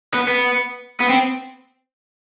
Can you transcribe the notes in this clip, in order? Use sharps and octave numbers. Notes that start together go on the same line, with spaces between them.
B3
B3
B3
C4